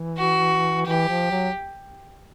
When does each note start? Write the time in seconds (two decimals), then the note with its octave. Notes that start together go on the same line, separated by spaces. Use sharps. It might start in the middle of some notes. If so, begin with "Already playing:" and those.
Already playing: E3
0.18 F#4
0.86 E3 G4
1.08 F3
1.31 F#3